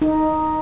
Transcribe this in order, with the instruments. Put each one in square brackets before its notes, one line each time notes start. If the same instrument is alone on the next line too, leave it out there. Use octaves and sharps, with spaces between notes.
[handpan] D#4